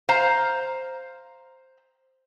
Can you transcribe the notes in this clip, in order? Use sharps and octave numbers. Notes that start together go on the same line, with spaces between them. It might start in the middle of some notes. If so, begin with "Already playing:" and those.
C5 F5 A#5